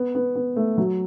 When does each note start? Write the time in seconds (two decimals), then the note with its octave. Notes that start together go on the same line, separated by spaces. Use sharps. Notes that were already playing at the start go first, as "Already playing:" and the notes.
Already playing: B3
0.15 B3
0.36 B3
0.56 A3
0.77 F#3